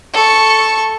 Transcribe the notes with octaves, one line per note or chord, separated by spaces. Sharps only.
A4 C#6